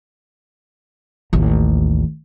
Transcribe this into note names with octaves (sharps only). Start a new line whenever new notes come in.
A1 D#2